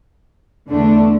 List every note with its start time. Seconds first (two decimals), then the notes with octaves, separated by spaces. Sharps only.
0.70 E2 D3 A3 D4